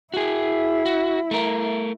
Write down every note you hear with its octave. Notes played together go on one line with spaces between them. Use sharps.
E4 F#4 G#4
F#4
A3 A#4